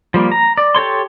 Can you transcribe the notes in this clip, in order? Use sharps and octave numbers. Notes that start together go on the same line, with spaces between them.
F3 G3 A#3
A#5
D5
G4 A4 C#5 C6